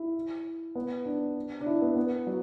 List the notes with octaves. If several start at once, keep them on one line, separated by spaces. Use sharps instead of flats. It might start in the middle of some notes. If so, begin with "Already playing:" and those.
Already playing: E4
B3
D4
D4
E4
B3
B3
F#3